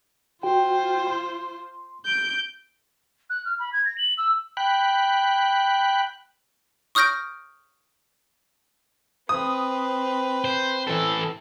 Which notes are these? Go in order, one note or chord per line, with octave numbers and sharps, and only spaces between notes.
F4 F#4 C5 G5
C6
G6 D7
F#6
F6
B5
G#6
A#6
F#7
E6
G5 B5 F#6
C#6 D#6 F6 G6 A#6 D7
C4 B4 D#6
C5
E3 A4